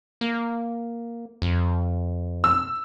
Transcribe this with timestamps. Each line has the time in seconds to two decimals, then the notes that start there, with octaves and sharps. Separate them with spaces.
0.21 A#3
1.42 F2
2.44 E6